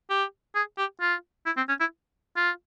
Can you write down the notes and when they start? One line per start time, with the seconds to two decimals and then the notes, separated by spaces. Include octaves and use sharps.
0.10 G4
0.55 G#4
0.78 G4
1.01 F4
1.46 E4
1.57 C4
1.69 C#4
1.80 E4
2.36 F4